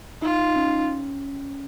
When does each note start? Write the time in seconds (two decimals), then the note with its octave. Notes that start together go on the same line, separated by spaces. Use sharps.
0.22 D#4 F4
0.48 D#4
0.56 C#4